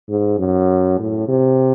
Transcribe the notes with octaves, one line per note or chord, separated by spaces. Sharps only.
G#2
F#2
A2
C3